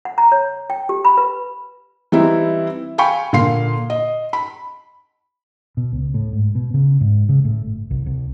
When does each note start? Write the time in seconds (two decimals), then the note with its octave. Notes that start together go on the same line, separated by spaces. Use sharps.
0.05 F#5
0.18 A#5
0.32 C#5
0.70 G5
0.89 G4
1.05 B5
1.17 B4
2.12 E3 G3 C4 D#4 E4
2.98 F5 G5 G#5 B5 C#6
3.33 A#2 D3 F5 C6 C7
3.90 D#5
4.33 B5
5.77 B2
5.93 C#2
6.14 A2
6.32 G#2
6.55 B2
6.74 C#3
7.01 G#2
7.29 C#3
7.45 A2
7.62 G1
7.91 C2
8.06 C2